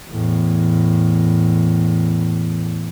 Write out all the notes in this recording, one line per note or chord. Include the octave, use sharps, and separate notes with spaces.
E2 A2